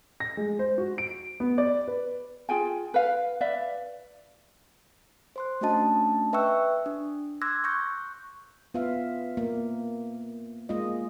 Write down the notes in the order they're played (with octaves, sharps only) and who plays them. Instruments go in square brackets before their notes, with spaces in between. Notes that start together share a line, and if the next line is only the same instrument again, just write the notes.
[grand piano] A#6
G#3
C5
F#4
D7
B3
D5
B4
[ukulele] F4 G#4 G5 G#5
B4 F5
B4 D5 E5 F5
[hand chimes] C5 C6 F#6
A3 C#4 D4 F#4 D#5 A5
B4 E5 G5 C#6 E6 F#6
D4
C6 D6 E6 F#6 G#6 A#6
C#6 F#6 G6 A#6
[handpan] B3 F4 E5 F5
A#3
G#3 A#3 F4 D#5